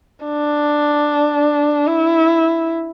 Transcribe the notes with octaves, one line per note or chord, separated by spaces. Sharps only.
D4
E4